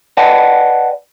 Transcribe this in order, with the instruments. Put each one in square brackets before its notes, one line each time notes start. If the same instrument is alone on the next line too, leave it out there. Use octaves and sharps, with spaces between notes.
[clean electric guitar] B4 D5 D#5 F#5 G5 A5